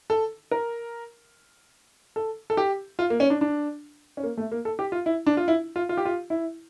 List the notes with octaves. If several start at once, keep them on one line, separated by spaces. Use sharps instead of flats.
A4
A#4
A4
A4
G4
F4
A#3
C#4
D4
D4
C#4
A#3
A3
A#3
A4
G4
F4
E4
D4
F4
E4
F4
F4
G4
F4
E4